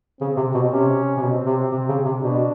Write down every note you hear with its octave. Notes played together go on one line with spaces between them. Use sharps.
C#3 C4
C3
B2
C3 C#4
C3
B2 C4
C3
C3
C#3
C3
B2 D4